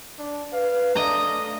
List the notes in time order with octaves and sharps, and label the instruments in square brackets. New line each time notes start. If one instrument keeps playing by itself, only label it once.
[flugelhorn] D4
[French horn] B4 [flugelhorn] F5
[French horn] A3 [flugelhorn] D4 [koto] D#5 A#5